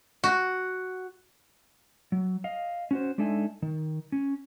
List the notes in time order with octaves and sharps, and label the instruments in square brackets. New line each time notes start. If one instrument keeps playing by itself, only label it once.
[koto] F#4
[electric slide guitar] F#3
D#5 F5
C#4 F#4 C5
G#3 D4 D#4 A4 E5 G#5
D#3
C#4